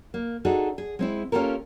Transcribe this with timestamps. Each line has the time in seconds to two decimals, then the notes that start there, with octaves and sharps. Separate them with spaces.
0.14 A#3
0.45 D4 D#4 F#4 G#4 A4
0.78 G#4
0.99 G#3 C4 E4
1.32 A#3 C#4 F4 G4 A4 A#4